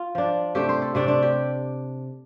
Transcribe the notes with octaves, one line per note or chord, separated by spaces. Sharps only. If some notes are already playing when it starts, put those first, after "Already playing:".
Already playing: F4
F3 D4
C3 A3 D4 G4
C5
A4
C3 A3 D4 D5
D4
G4